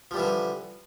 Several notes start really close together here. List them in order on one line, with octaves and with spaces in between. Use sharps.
F3 G3 E3 D3